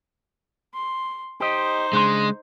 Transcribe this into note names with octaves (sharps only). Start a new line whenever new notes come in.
C6
D#4 G4 C5 D#5
C#3 G#3 D4 C6